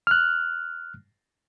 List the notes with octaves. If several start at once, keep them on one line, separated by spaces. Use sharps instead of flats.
F6 F#6